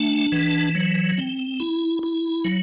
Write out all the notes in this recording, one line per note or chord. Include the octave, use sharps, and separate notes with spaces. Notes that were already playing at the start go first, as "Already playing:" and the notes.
Already playing: A3 D4
E3
F#3
C4
E4
E4
F#3